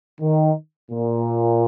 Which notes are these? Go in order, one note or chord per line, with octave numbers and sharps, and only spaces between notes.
D#3
A#2